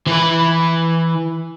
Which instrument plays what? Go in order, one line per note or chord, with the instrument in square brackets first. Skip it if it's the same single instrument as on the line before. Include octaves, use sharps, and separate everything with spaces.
[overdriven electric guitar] E3 B4